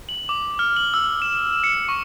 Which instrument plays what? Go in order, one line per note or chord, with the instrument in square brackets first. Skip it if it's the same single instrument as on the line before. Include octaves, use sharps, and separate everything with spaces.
[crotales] F#7
D6
F6
F#7
E6
E7
C#7
C#6